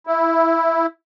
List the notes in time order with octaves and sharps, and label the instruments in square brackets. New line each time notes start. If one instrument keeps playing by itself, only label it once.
[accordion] E4